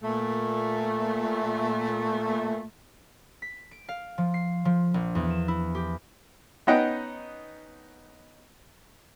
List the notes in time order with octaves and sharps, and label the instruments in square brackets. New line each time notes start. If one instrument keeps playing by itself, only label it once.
[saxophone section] A#2 A3
[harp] B6
D7
F5
F3
C7
F3
A#1
E2
E7
E4
G4
[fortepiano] B3 C#4 D#4 D#5 F#5 G5